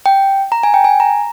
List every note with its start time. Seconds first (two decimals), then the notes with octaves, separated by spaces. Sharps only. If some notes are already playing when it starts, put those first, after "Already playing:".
0.06 G5
0.52 A#5
0.63 G#5
0.74 G5
0.84 G#5
1.00 A#5